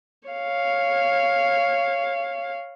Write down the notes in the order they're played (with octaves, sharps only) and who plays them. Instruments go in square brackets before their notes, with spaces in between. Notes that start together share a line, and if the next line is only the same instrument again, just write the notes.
[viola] C#5 F5